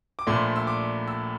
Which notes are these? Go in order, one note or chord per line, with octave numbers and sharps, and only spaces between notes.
D6
A#1 A#2 A3 C6
E6
D6
E6